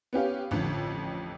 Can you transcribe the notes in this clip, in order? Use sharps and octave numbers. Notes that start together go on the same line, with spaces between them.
B3 C#4 G4 F5
A1 F2 D3